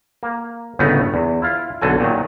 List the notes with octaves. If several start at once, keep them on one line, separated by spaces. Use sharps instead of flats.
A#3
G1 A2 C#3 A3 B3 D#4
E2
E4 F4 F5
B1 D3 F#3 A4 G#5
A#2 D#3 F#3